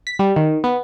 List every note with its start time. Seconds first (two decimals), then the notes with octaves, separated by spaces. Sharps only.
0.07 B6
0.19 G3
0.36 D#3
0.64 B3